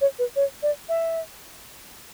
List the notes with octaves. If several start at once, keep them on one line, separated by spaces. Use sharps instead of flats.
C#5
B4
C#5
D5
E5